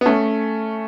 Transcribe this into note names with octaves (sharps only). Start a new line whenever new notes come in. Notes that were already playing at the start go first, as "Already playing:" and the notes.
B3
A3 C#4